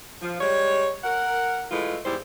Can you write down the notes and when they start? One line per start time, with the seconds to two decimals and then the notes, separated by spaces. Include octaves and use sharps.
0.22 F3
0.41 G3 G#3 C#5
1.04 A#4 F#5
1.71 E3 G#3 A3 E4 F4
2.05 E2 G#2 G3 E4 C5